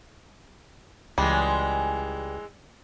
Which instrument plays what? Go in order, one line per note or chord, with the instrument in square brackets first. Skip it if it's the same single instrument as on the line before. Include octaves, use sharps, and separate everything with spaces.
[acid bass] C#2 [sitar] E3 G#3 [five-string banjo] G3